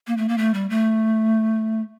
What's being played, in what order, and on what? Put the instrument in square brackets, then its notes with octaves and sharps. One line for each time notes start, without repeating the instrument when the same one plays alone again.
[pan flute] A#3
A3
A#3
A3
G3
A3